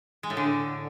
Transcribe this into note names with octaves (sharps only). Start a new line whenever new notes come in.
G#3
A2
D3